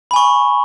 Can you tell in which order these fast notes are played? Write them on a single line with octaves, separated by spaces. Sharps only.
B5 G#5 C#6